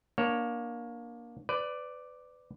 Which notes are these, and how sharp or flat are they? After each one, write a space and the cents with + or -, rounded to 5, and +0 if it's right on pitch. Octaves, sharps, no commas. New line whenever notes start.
A#3 +20 D4 +5 C#5 +0
B4 +25 D5 +0